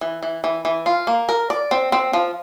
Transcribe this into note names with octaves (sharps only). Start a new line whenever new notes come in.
E3
E3
E3
E3
F4
A#3
A#4
D5
C4
C4
F3